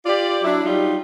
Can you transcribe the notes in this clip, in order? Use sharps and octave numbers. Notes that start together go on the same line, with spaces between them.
F4 G4 D5
F#3 D4 E4
F#3 G3 D#4 F4